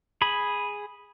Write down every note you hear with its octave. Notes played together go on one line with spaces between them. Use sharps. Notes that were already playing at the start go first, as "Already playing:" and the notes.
G#4 B5